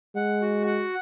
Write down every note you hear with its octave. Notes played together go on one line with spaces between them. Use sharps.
G#3 F#5
F#4
F#5